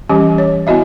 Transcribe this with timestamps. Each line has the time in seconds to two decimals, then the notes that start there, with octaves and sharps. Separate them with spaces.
0.09 E3 G3 C#4 G4
0.38 C#5
0.67 B3 E4 F#4 D#5 E5